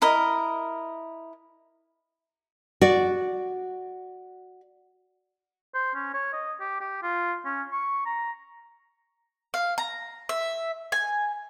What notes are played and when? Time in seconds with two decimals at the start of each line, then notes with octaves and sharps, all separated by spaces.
0.02 E4 A#4 D#5
2.81 F#4 D5
5.75 C5
5.95 C#4
6.14 C#5
6.33 D#5
6.60 G4
6.81 G4
7.03 F4
7.45 C#4
7.72 C#6
8.05 A#5
9.54 F5
9.78 A#5
10.29 E5
10.92 G#5